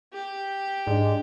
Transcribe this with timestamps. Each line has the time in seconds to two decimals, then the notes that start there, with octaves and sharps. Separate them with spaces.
0.13 G4
0.87 G#2 G#3 D4